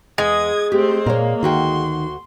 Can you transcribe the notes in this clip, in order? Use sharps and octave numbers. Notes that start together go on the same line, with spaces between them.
E2 G#3 D#6 G#6
A3 C4 G4 C5
A#2 A#3 A#4 C#5
D2 D#3 F#4 G5 C6